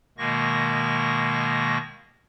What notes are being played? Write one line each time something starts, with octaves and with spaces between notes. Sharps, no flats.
B2 D#3 G#3 A#3 C#6 A#6